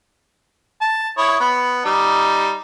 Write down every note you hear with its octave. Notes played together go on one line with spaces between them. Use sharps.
A5
E4 C#5 D#6
B3 B5
G3 D#4